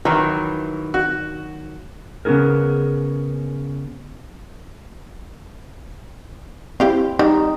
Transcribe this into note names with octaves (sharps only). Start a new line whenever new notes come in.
D#3 E3 F#3
F#4
C#3 B3 C#4 D#4 G#4 A#4
C4 E4 G4 F5
G3 D#4